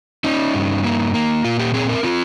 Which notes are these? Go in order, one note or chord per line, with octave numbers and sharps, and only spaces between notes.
C#4 D#4
G2
A#3
A#3
A#2 F4
G4
C4 G#4
A#4
C4 F4